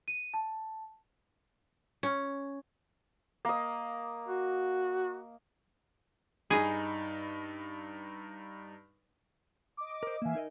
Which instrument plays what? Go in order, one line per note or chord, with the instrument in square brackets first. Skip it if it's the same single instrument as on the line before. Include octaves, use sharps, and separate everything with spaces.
[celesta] D#7
A5
[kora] C#4
[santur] A#3 D#5
[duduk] F#4
[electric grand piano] G2 D#4 B5 [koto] G#4
[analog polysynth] D#5 D6
[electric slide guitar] A#4 C5
[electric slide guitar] E3 A#3 [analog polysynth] E5 F5 G#5
[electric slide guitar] D#4 A#4 D#5